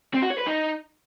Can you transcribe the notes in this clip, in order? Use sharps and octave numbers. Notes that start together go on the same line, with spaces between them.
C4
F#4
C#5
B4
D#4